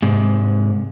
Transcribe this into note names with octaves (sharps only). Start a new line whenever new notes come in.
G#2 C3